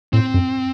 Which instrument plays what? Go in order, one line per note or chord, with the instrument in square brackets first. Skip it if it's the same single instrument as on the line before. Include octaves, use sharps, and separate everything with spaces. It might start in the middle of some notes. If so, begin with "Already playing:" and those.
[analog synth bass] A2 [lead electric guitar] C4
[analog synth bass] F#2